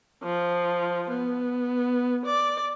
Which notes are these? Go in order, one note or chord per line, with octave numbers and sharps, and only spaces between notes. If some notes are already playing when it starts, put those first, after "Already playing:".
F3
B3
D5